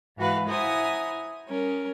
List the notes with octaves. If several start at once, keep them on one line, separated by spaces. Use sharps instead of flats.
G#2 E3 F#4 B4 F5 F#6
E4 C5 F#5 G#5 A#5 D#6
G3 C#4 A#4